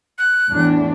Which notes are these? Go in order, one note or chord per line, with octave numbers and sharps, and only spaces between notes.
F#6
E2 A2 D4